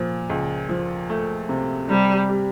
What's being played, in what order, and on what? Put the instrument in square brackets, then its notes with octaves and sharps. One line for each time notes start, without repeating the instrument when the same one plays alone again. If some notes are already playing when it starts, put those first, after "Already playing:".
Already playing: [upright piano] A#2 F3
C#2
F3
A3
C3
[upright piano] C3 [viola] G3
[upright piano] G3